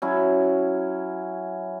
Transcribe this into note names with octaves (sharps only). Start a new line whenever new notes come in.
F#3 C#4 E4